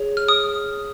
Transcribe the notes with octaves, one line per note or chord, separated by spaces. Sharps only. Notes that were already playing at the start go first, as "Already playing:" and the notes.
Already playing: G#4 C#5
F6
D#6